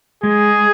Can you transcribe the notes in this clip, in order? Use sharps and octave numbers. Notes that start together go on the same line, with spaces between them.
G#3 G#4